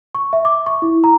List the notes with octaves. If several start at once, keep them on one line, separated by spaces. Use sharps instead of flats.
C#6
E5
D6
C#6
E4
A#5